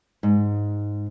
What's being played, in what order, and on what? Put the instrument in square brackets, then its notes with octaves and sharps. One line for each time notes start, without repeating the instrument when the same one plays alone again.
[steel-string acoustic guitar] G#2